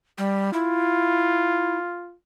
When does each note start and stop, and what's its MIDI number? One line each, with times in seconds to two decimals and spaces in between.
0.18 0.50 55
0.53 1.77 64
0.53 2.15 65